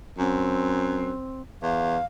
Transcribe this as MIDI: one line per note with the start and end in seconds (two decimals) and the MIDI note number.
0.18 1.12 42
0.18 1.42 60
1.63 1.98 40
1.63 2.06 77